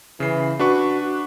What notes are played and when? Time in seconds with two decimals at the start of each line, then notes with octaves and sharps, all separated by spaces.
0.20 C#3 E3 C7
0.59 D4 F#4 B4 C#6